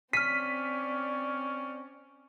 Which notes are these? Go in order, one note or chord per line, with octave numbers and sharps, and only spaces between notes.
C4 C#4 D5 F6 B6 D#7